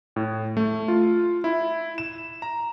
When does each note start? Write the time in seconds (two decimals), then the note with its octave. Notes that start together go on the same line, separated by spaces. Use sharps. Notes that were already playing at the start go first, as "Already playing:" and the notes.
0.16 A2
0.57 A3
0.88 F4
1.44 E4
1.98 E7
2.42 A#5